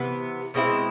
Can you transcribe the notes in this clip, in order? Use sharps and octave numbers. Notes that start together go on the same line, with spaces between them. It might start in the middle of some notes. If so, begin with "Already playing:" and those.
Already playing: C3 E3 B3
B2 G#3 C4 E4